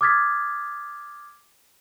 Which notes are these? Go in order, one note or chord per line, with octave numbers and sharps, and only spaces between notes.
D6 D#6 F6 G#6 A6 B6